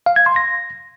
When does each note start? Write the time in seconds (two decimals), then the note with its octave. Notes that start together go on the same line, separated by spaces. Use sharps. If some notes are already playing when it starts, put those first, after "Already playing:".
0.06 F5
0.16 G#6
0.26 C6
0.36 A#6